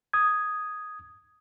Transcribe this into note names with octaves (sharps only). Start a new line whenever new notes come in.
D#6 G#6